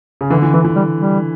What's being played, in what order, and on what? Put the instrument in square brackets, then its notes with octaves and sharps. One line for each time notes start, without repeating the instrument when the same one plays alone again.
[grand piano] C#3
[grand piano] D3 [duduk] E3
[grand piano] E3
[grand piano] D3 [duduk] E3
[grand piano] E3
[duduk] G3
G3